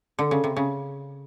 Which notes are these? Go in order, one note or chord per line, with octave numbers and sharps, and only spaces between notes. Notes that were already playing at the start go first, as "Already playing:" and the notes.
D3
C#3
C3
C#3